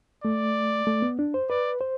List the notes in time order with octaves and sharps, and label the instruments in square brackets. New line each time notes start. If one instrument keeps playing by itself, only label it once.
[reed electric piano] A3 [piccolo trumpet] D5
[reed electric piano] A3
B3
D4
C5
[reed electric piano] B4 [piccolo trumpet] D5
[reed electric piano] C5